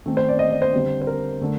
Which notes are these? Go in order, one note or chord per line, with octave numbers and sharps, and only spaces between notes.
D#3 A3 C4
C5
D5
D#5
D5
C5
D3 G3 C4
C5
A#4
D3 A3